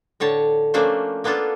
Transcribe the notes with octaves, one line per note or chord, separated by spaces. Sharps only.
A2 D3 C#5 A5
F3 A3 A#3 C#4 D4 C5
A#3 B3 D4 F4 A4